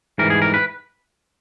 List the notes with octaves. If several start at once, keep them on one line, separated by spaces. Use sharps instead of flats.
G#2 E3 G3 A#4
G#4
A#4
B4